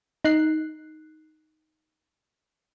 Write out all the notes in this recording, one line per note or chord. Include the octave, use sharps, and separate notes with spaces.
D#4 F#6 C7